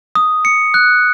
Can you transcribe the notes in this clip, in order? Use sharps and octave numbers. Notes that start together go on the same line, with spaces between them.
D#6
C#7
F#6